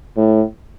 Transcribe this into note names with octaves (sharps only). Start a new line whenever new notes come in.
A2